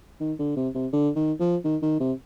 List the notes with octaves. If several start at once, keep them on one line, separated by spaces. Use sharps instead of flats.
D#3
D3
C3
C3
D3
D#3
F3
D#3
D#3
C3